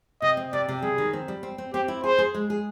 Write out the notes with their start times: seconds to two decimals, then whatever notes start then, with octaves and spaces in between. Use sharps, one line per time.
0.22 C3 D#5
0.37 C4
0.53 C3 D5
0.69 C3
0.82 G3 G#4
0.98 D#3
1.13 C4
1.28 G3
1.43 C4
1.58 C4
1.73 C4 G4
1.88 E4
2.04 G#4 C5
2.18 G#4
2.34 G#3
2.50 G#4